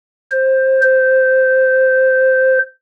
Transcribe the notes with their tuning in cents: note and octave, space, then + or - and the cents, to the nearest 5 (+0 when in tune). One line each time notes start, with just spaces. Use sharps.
C5 +15
C5 -5